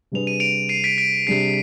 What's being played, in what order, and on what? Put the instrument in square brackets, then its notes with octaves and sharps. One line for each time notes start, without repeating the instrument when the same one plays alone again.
[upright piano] C3 G3 D4 G#4 B4 [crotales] F7
[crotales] D#7
D7 F7
C7 D#7
B6 D7
B6 D7
[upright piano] C3 G3 D4 G#4 [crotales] C7